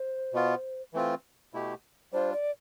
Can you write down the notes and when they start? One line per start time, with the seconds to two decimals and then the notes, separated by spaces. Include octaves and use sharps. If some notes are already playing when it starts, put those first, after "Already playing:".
Already playing: C5
0.33 B2 B3 F4
0.94 E3 A3 C4 F4
1.54 B2 A3 E4 G4
2.12 G3 D4 F4 C5
2.33 D5